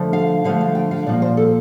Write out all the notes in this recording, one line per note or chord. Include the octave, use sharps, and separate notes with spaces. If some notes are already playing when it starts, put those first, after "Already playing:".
Already playing: D3 F3 A3
F5
D3 F3 A3 F5
F5
G5
F5
A#2 F3 A#3 D5
C5
A4